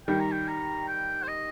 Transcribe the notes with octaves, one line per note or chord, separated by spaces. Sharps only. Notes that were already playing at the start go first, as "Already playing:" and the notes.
D#3 G3 G5
A#5
G5
A#5
G5
C5
D#5